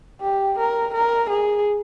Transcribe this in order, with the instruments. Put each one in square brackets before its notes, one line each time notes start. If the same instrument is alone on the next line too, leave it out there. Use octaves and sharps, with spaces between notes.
[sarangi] G4
A#4
A#4
G#4